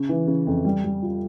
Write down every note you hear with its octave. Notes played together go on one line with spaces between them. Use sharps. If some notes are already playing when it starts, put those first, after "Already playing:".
Already playing: C#3
E3
C#3
F2
G3
G3
F4